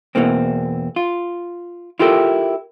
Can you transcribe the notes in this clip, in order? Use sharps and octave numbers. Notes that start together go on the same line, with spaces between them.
E2 B2 E3 A#3 C4
F4
E4 F4 G4 A4 A#4